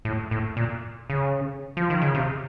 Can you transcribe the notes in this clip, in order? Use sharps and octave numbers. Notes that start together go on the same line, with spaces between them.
A2
A2
A#2
C#3
F3
D#3
C#3
C3